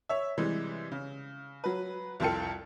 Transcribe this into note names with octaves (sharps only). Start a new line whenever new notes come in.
C#5 E5
C3 E3 G3 G#3
C#3
F#3 B4
C2 F2 F4 A4 G5 C#7